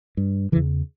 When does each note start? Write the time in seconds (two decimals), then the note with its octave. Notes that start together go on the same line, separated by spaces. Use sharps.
0.17 G2
0.52 C#3 E3
0.56 E2